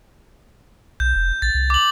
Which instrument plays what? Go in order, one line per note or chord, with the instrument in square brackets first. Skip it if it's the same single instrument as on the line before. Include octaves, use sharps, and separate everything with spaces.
[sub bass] B1 [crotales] G6
[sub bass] F1
[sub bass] A#1 [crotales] A6
[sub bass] C2
[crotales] D6 F#7